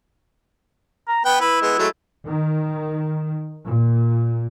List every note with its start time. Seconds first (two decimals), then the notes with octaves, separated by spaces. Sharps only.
1.08 A#5
1.25 B3 B4 G5
1.41 E4 B4
1.62 G#3 B3
1.79 F#3 G#3 A3
2.25 D#3
3.66 A#2